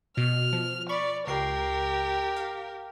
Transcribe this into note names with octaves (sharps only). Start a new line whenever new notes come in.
B2 F6
F3
D5 B5 C#6
C#2 G4 A#4 C7
F5